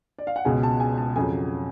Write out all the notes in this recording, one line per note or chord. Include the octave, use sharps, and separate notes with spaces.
D5
F5
F#5
C#2 B2 G#3 G#5
A5
G#5
A5
F2 C#3 F#3 G#5